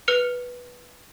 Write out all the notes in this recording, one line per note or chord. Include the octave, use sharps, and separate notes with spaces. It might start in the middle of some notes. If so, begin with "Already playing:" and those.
B4 F6 C#7 F7